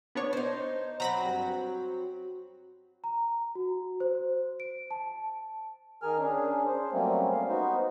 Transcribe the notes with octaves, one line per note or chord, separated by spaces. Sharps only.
B3 D4 C#5
D#4 C5
F#3 C4 F#4 A#5 B5 A#6
G2
A#5
F#4
C5
D7
A5
D#3 G#4 A#4 G#5 F6
C#4 D4 G#4
C5
F#3 G3 A3 A#3 C4 C#4
F5
B3 D#4 F#4 C5